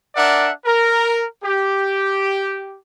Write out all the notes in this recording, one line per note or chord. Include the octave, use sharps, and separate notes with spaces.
D4 A#4 D5 E5 F#5
A#4
G4